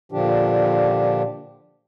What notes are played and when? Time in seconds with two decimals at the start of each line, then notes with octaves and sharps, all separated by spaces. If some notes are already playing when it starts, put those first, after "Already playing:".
0.12 A#2 D3 F3 D4 G4